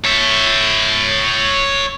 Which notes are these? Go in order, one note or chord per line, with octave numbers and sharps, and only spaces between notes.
C#5 E5